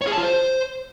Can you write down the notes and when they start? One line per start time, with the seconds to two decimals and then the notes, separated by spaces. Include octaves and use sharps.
0.01 C#5
0.07 G#4
0.12 A5
0.18 F4
0.23 C5